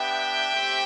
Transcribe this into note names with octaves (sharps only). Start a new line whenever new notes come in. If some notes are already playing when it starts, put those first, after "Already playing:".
Already playing: B3 D4 G4 E5 G5
A3 C4 G4